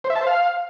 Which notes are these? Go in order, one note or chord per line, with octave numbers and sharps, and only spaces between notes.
C5
E5
A5
C5
F5